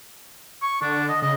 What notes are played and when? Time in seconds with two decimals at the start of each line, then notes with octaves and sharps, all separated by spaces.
0.62 C#6
0.82 D3 D4
1.09 D#5
1.22 C#3 D#5